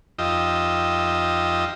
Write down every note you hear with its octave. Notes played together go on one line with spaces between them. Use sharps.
F2 D#4 F4 G4 D#5 E5